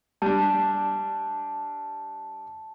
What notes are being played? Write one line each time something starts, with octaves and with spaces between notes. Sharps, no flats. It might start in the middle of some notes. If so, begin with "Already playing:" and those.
G3 D4 A5